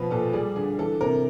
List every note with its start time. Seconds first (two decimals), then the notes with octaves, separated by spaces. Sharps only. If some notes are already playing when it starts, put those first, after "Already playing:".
Already playing: B2 F3 B4
0.11 A#2 A4
0.33 G3 G#4
0.56 D3 G#4
0.78 E3 A4
1.01 C3 A#4